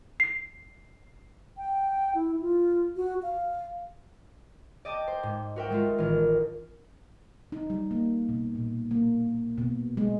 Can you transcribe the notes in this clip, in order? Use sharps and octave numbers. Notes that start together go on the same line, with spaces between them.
C7
G5
E4
F4
F#4
F5
D5 D#5 G5 A5 D6
C5
G#2
F#4 A#4 E5 G5
G#3 A3 F4
A1 D#3 A#4
D#4
G3
A#3
B2
A#2
A#3
B2
G#3